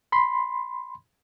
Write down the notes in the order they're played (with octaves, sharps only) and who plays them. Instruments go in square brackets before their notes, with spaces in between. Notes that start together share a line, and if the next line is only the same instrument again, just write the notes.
[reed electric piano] B5 C6